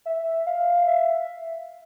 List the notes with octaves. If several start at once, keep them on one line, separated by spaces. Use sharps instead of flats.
E5
F5
E5